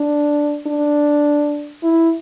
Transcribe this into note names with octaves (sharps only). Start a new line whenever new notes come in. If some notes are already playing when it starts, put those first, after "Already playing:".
Already playing: D4
D4
E4